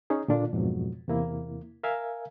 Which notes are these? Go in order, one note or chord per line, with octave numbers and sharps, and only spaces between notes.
C#4 D#4 G#4
A#2 D3 D4 F4
F2 G#2 B2 F#3
E2 C3 A#3 E4
A#4 E5 F5 G#5